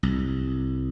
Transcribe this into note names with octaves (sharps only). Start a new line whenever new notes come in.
C2